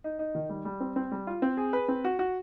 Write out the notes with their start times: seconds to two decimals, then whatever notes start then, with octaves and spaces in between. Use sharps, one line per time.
0.04 D#4
0.19 D#4
0.35 D#3
0.49 G3
0.65 G3
0.80 C4
0.96 C4
1.12 G3
1.27 F4
1.42 C4
1.57 G#4
1.73 B4
1.88 C4
2.04 F#4
2.19 F#4